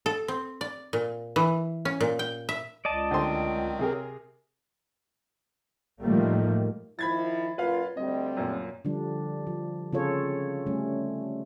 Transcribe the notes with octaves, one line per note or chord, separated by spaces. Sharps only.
A4
C4
D5
A#2
E3
C#4
A#2
G5
E5
C#2 D5 D#5 A5
D2 D#3 F#3 C4 C5 C6
C3 G#4 A#4
A2 D#3 F3 G3 A3 A#3
D#3 F3 E4 B5 G#6 A6
F#2 A#2 F4 B4 F5
D2 G3 C4 D#5
F#2 A#2
D3 F3 G3 D4
F3
C#3 C4 F4 G#4 A4 C#5
G3 A3 C#4